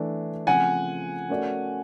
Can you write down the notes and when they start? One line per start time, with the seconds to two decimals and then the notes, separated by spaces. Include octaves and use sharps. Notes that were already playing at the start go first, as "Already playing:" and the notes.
Already playing: E3 A3 D4
0.47 C#3 F3 A3 C4 F#5 G#5
1.29 A3 C#4 F#4 A#4 D5